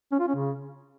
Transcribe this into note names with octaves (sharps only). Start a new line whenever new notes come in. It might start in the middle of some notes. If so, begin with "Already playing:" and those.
C#4
F4
C#4
C#3